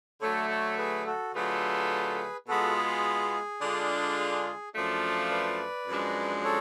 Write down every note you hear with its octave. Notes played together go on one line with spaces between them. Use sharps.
D3 F#3 A3 A4 C#5
A4 C#5
G#4 B4
F#4 A4
D3 F#3 A3 F4 G#4 A4 B4
B2 G#3 B3 F4 F#4 A4
G#4
D3 G#3 D4 F4
G#4
F#2 F3 A3 D4 F4
B4 D5
F#2 F3 G#3 D4
A4 C#5